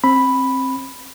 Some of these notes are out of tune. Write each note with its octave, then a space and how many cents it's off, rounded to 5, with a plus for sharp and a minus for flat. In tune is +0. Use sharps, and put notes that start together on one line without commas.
C4 +20 B5 +0